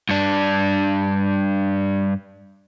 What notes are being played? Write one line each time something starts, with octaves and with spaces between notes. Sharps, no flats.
G2 D4